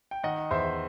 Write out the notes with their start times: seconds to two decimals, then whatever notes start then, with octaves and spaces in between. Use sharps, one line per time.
0.11 G5
0.24 D#3 D#5 F#5
0.51 E2 C5 E5